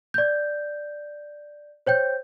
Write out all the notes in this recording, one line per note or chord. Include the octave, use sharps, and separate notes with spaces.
D5 G6
C5 C#5 G5 G6